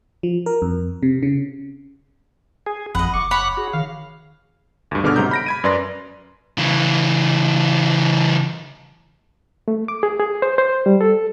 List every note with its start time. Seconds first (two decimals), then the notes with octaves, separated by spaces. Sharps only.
0.23 F3
0.46 A#4
0.62 F2
1.03 C3
1.23 C#3
2.66 G#4
2.95 G#1 F2 D#5 F#5 B5
3.14 F#1 C#6 D6
3.31 C#5 F#5 B5 F#6
3.57 F#4 G#4
3.73 D#3 F5
4.91 D2 G2
5.03 G1 B2 D3 G#4 D6 F6
5.16 G#2 C3 F#3 A#5 G6
5.31 B5 A#6 D7
5.46 B5 G#6 D#7
5.64 F#2 B4 D5 C6 A#6
6.58 C#3 E3
9.68 A3
9.88 D6
10.03 G#4
10.20 G#4
10.42 C5
10.58 C5
10.86 G3
11.01 A4